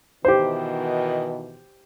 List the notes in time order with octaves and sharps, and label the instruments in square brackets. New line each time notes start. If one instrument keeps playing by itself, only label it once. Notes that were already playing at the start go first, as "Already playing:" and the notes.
[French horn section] B2 D#3 E3 [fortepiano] G4 C5